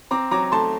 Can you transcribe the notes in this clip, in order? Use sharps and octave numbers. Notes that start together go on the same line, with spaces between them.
C4 A#5 D6
F#3 A#5 D6
A3 A5 C6